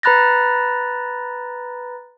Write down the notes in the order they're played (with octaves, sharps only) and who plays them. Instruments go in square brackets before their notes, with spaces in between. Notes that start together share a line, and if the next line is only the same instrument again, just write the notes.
[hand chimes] B4 A#5 B5 F#6 A6 A#6